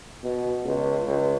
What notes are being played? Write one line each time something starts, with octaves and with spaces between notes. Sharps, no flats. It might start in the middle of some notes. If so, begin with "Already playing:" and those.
B2
C#2
C#2